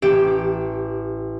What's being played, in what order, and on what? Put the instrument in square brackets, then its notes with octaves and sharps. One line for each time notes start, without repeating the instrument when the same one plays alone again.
[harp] A1 G4 D7 E7